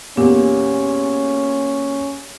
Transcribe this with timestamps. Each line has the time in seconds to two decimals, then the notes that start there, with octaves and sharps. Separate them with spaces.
0.17 E2 A#2 C#4 G4